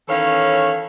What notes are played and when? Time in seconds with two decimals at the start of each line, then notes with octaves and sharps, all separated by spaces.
0.08 D#3 E3 C#4 A4 C#5 F5